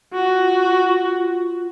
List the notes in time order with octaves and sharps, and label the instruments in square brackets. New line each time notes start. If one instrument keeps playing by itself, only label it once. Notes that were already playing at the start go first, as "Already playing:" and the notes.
[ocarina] F4 [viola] F#4